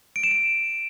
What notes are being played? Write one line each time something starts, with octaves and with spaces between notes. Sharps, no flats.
D7
E7
D7